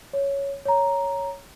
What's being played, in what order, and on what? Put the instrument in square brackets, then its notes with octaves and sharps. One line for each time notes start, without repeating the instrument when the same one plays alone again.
[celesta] C#5
C#5 A#5